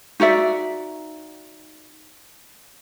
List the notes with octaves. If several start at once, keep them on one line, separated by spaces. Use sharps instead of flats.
D#4 F#4 D5 E5